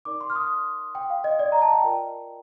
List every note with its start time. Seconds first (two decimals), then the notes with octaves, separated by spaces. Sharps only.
0.05 D#4 A#4 D5 D6
0.21 C6
0.30 F6
0.35 D#6
0.95 G5
1.10 F5
1.24 D#5
1.39 D5
1.52 A#5
1.62 A5
1.73 G5
1.84 F4 A#4 D5